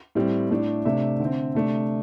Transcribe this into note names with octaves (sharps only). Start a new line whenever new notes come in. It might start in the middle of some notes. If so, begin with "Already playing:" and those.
A2 G3 C4
A2 A3 D4
C3 A3 D4 E5
D3
C4
C3 A3 D4